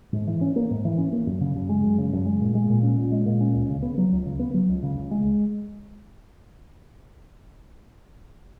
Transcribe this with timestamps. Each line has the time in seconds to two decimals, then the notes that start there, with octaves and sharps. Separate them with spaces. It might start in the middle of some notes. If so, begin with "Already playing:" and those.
0.13 G#2
0.27 E3
0.41 C#4
0.56 A#3
0.71 G#2
0.85 E3
0.98 C#4
1.13 A#3
1.27 F#2
1.41 C#3
1.55 F#2
1.69 G#3
1.83 F#2
1.98 C#3
2.13 F#2
2.26 G#3
2.41 A#2
2.55 G#3
2.70 A#2
2.83 C#4
2.98 A#2
3.12 G#3
3.26 A#2
3.40 C#4
3.55 C#2
3.69 C#3
3.82 B3
3.98 F#3
4.12 C#2
4.26 C#3
4.39 B3
4.54 F#3
4.69 C#2
4.83 C#3
4.96 C#2
5.11 G#3